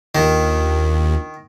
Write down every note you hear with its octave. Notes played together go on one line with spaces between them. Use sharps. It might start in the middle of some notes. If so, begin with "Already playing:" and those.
D#2 D#3 D4 F4